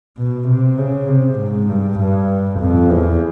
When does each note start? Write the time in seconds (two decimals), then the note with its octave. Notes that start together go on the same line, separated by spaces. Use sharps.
0.18 B2
0.48 C3
0.78 C#3
1.08 C3
1.38 G#2
1.69 G2
1.99 G2
2.60 F2
2.90 E2